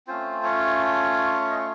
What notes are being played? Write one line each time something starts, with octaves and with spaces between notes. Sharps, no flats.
A3 C4 C#4 F4 C5
C#4 C#5
D#5
C#5